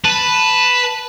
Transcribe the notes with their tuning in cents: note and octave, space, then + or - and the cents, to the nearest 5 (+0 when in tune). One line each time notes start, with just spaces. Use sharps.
B4 +0 A5 +0